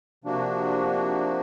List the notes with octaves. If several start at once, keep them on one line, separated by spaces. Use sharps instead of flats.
C3 F3 A#3 D4 F#4